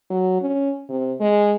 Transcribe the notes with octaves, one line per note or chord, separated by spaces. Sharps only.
F#3
C#4
C3
G#3